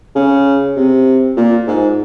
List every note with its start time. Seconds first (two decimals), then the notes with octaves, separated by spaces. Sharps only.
0.16 C#3
0.76 C3
1.37 A#2
1.67 G#2